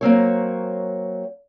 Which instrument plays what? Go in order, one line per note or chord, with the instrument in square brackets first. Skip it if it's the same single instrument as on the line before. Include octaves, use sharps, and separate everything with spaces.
[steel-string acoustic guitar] F#3 A#3 C4 C#5